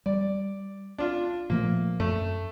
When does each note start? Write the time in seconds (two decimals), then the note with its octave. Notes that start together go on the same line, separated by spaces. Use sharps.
0.06 G3 D5
0.98 D4 F4
1.50 A#2 F3 A3 A#3
2.00 F#2 A3